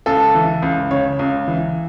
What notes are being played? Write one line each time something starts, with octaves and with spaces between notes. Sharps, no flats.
C#2 A4
E3
C#2
C#3 C#5
C#2
E3